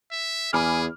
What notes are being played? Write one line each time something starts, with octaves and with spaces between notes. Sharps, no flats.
E5
E2 G#4 G#5 B5 D6 F6